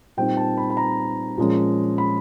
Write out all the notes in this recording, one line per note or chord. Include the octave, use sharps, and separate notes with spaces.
A#2 G3 C4 D#4 G5
A5
B5
B5
A#5
A#2 F3 G#3 C#4
B5